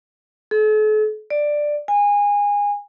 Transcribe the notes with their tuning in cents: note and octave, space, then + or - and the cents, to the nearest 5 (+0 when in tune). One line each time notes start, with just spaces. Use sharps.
A4 -45
D5 +10
G#5 -25